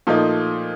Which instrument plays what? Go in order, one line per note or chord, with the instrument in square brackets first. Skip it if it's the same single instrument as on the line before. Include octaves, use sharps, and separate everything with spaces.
[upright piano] A#2 F3 A3 D#4